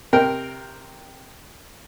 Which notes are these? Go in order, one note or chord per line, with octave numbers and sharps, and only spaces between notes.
C3 A#4 G5